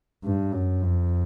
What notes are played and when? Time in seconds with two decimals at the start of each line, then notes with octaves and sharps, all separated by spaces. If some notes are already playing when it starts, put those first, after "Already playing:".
0.24 G2
0.53 F#2
0.82 F2